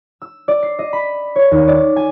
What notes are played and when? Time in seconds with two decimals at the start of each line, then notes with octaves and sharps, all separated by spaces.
0.22 E6
0.48 D5
0.63 C7
0.79 D#5
0.93 B5
1.36 C#5
1.51 D#2
1.68 D5
1.96 G#5